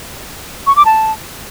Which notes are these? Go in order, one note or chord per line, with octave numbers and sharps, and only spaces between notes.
C#6
D6
A5